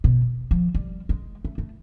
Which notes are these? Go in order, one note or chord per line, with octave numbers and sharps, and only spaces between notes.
B2
F3
G3
G#3
A3
A3